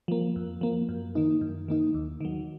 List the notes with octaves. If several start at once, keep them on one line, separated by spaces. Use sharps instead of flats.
F3 A#3
F2
F3 A#3
F#2
D#3 A#3 D#4
F#2
D#3 A#3 D#4
D#2
D#3 F#3